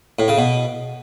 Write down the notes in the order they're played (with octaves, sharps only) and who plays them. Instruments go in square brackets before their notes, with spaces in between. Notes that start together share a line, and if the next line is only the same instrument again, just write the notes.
[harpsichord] A2
C#3
B2